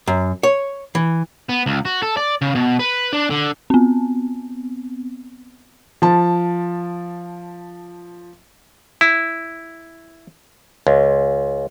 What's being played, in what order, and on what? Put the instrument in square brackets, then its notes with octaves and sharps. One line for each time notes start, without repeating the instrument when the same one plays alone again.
[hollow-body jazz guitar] F#2
C#5
E3
[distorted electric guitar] B3
C#2
F#4
A4
D5
C#3
B2
B4
D4
D3
[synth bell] B3 C4
[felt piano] F3 A5
[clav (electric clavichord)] E4
C#2